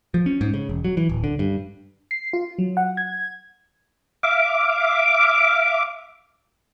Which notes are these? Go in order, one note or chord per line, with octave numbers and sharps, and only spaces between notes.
F3
C#4
G#2
C#3
E1
F#3
E3
D1
D3
G2
C7
F4
F#3
F#5
G#6
E5 F5 D6